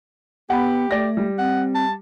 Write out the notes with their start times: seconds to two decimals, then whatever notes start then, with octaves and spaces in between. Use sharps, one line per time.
0.50 B3 G4 F#5 B5
0.91 A3 D5 A#6
1.17 G3
1.39 C4 F#5
1.75 A5